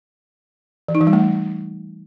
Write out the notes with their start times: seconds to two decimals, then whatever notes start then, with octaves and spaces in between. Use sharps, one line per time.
0.88 E3
0.95 D#4
1.01 E3
1.07 G3
1.13 A3